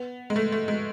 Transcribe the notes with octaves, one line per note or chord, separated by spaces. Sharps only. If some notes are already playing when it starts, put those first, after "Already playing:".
Already playing: B3
G#3
A3
A3
G#3